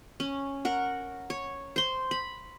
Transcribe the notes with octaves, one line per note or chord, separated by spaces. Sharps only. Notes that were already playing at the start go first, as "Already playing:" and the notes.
C#4
A#4 F#5
C#5
C5 C6
B5